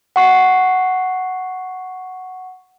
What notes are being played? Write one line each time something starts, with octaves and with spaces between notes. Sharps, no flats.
F#5 C#6 C7